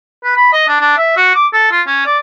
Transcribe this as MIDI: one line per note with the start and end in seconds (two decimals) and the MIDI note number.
0.24 0.35 71
0.36 0.53 83
0.53 0.66 75
0.68 0.76 62
0.81 0.97 62
0.98 1.14 76
1.17 1.33 66
1.35 1.46 86
1.53 1.69 69
1.71 1.81 65
1.87 2.05 61
2.06 2.18 74